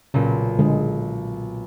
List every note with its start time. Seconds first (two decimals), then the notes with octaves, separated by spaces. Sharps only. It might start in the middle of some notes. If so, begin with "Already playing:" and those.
0.14 B1 A#2 C#3
0.59 D3 G#3 G#4